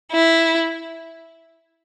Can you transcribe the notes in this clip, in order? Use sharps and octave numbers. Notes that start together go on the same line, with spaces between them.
E4